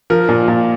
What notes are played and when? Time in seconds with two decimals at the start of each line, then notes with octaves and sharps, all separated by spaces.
0.10 F3 A#4
0.29 A#2
0.48 A#2